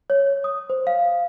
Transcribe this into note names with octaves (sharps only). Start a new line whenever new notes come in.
C#5
D#6
C5
F5